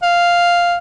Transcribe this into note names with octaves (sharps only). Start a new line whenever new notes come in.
F5